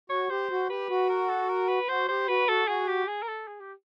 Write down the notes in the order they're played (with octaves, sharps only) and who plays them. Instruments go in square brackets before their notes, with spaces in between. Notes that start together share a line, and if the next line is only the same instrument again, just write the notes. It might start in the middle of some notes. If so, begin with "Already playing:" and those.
[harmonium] F#4 [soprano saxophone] C#5
[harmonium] G4 [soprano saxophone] C5
[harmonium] F#4
[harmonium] G4 [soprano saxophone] B4
[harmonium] F#4
[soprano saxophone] A#4
A4
A#4
B4
[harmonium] F#4 [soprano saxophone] C5
[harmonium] G4 [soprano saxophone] C5
[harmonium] F#4 [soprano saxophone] B4
[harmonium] F#4 [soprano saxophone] A4
[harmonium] F#4 [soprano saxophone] G#4
[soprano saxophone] G4
G#4
A#4
A4
G#4
G4